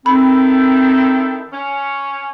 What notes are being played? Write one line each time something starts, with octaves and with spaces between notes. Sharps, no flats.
D#3 C4 E4 A4 B5
C#4